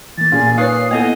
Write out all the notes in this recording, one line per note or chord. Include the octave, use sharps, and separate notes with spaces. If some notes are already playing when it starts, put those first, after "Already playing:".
E3 A#3 A6
A#2 F4 G#4 G#5
D#4 B4 C#5 F5 D#6 F#6 C7
A#3 B3 E4 A4 D#5 F#5